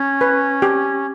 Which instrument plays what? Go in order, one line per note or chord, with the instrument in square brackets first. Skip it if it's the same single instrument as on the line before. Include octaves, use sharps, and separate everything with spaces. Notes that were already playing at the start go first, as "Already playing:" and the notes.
Already playing: [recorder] C#4
[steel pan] B4
G4